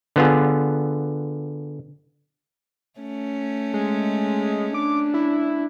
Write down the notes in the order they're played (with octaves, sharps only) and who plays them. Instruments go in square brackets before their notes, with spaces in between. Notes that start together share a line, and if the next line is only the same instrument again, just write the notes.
[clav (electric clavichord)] D3 B3 F4 G#4
[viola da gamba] A3 C#4
[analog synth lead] G#3
[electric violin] D4 [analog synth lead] D6
[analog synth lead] E4